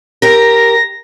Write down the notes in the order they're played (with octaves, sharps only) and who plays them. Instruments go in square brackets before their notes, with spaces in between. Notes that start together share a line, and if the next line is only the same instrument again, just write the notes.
[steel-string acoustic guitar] G4 A#4 [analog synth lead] A#6